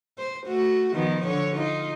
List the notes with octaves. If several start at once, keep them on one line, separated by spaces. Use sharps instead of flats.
C5
A3 F#4
D#3 F3 B3
D3 C#5
D#4 F4